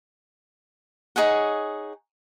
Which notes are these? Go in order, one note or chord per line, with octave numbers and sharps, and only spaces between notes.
D#4 G#4 C#5 F#5